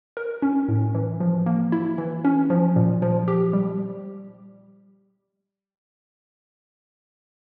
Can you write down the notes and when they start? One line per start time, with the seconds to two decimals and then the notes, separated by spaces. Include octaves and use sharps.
0.17 A#4
0.42 C#4
0.68 A2
0.95 E3
1.20 F3
1.46 A#3
1.72 E4
1.98 E3
2.25 C#4
2.50 F3
2.76 A#2
3.02 F3
3.28 G4
3.53 G3